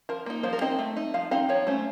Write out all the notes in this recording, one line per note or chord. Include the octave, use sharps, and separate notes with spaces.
F3 A#4
A#3 D#4
F3 C5
A#4
C4 D#4 D#5
A3
D#4
F3 F5
C4 D#4 F5
F3 C#5
A3 C#4 C5